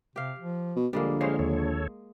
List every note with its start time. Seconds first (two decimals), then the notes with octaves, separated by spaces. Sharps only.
0.16 C3 G4 F5
0.39 F3
0.76 B2
0.93 A#1 D3 G3 G#3 A#3
1.21 G#3 C5 C#5 F5
1.39 D#2 A4 C#5